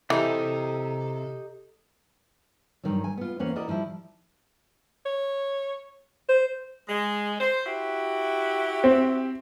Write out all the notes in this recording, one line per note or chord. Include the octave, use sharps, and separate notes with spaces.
C3 E3 D#4 G4 A4 C5
G2 B2 D#3 F#3
G#5
B3 F4
E2 A#3 C#4 C5 F#5
E4 F#4 A#4 D5 D#5
D#3 F3 G3 E4
C#5
C5
G#3
C5
E4 F#4 G4
C4